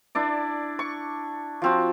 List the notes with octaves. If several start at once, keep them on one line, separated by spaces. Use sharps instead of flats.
D4 E4 D5
C#6
F3 C4 F#4